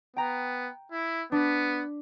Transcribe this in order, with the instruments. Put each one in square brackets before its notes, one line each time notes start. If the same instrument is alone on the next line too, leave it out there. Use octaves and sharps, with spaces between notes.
[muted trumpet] B3 [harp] G5 A#5
[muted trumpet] E4
[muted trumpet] B3 [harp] D4 B6